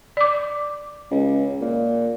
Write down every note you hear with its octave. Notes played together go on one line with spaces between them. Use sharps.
D5 D6
C#2
A#2